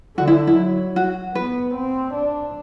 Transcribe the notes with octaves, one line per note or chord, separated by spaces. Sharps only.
D3 F#4
E4
E4
F#3
F#4
B3 B4
C4
D4